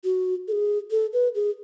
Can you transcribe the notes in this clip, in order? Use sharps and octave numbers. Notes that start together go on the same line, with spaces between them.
F#4
A4
G#4
A4
B4
G#4